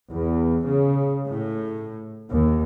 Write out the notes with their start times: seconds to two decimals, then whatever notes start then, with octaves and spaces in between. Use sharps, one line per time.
0.11 E2
0.66 C#3
1.27 A2
2.29 D#2